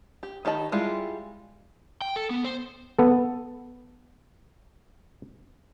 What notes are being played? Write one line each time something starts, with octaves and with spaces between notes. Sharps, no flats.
G4
D#3 G4 D#5 A5 B5
G3 G#3 E4 F4 G4
G5
A4
B3
C5
B3 A4